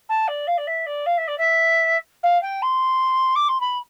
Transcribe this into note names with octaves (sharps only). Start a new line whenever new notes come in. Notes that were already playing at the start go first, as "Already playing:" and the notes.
A5
D5
F5
D5
E5
D5
F5
E5
D5
E5
F5
G5
C6
D6
C6
B5